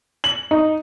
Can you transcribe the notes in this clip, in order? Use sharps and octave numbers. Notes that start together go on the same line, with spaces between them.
F#7
D#4